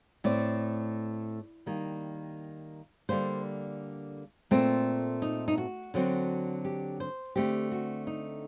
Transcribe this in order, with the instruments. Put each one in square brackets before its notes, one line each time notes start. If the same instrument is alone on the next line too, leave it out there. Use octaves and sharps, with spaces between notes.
[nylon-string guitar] A2 A3 C4 D5
D#3 G3 A#3
D3 G3 A#3 C5
A#2 A3 C4
D#4
D#4
F#4
D3 F#3 C4
G4
C5
D3 A3 C4 G4
F#4
D#4